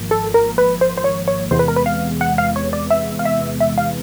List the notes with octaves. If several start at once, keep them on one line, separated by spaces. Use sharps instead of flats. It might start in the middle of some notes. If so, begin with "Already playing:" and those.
Already playing: G#1 G#2 F3 A#3
A4
A#4
B4
C5
C5
C#5
C#5
E2 C3 E3 G#3 B3 C5
B4
A#4
B4
F5
F#5
F5
C#5
D5
E5
F5
E5
E5
F5